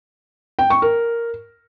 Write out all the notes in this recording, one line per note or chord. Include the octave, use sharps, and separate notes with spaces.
G5
C#6
A#4